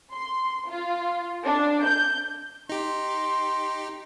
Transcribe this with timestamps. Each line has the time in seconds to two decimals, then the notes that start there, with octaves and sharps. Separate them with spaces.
0.13 C6
0.69 F4
1.45 D4
1.85 G6
2.69 D#4 G4 C6